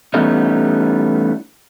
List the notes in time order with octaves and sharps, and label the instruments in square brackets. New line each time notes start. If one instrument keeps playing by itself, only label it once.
[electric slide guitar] E3 G3 A3 B3 C#4 D#4